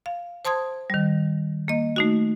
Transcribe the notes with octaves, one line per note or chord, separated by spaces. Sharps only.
F5
C5 A5 C6 D#6 G#6
D#3 G3
A#3 D#5
A3 D#4 F#4